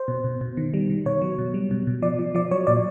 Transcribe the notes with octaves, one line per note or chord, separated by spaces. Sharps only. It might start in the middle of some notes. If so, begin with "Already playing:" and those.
Already playing: C5
B2
B2
B2
D#3
G3
D#3
B2 C#5
F#3
B2
G3
B2
B2
F3 D5
F3
F3 D5
F#3 C#5
A#2 D5